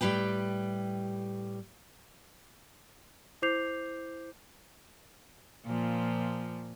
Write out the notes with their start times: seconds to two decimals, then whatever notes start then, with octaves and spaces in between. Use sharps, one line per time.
0.01 A2 G3 G4 B4 G5
3.42 E4 C5 D6 G6 C7 F7
5.66 A#2 F3